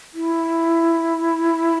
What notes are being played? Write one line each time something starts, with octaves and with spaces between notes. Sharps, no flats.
E4